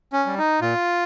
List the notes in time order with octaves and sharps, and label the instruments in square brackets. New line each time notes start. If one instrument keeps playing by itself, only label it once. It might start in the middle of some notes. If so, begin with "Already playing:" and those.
[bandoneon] C#4
G3
D#4
A#2 F4